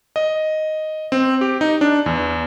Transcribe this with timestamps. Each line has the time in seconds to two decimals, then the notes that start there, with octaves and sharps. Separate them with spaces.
0.16 D#5
1.12 C4
1.41 G4
1.61 D#4
1.81 D4
2.06 E2